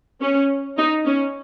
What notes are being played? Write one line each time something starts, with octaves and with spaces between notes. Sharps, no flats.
C#4
D#4
C#4